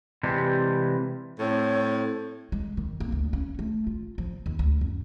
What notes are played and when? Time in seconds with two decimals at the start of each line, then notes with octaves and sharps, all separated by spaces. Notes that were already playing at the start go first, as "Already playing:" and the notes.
0.23 C3 E3 G3 G#3
1.39 A2 C4 C#5
2.52 G#3
2.77 D#3
3.00 A#3
3.12 D2
3.33 C#4
3.59 A3
3.87 F4
4.18 F3
4.46 D#2
4.59 D2
4.81 F#2